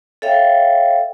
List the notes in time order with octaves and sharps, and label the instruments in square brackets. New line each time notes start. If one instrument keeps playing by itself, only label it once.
[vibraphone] A4 C#5 E5 F5 G5